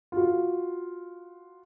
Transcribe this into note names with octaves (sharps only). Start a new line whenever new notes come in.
F4 F#4